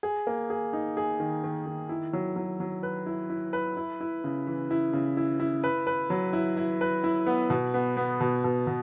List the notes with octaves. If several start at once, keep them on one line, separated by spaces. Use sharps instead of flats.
G#4
A#3
G#4
D#4
G#4
D#3
D#3
D#3
E4
F#3
F#3
F#3
B4
E4
E4
B4
E4
E4
C#3
E3
E4
C#3
E4
E4
B4
B4
F#3
E4
E4
B4
E4
B3
B2
B3
B3
B2
B2
B2